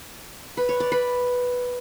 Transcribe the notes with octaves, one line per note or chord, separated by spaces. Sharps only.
B4
C#5
D5
B4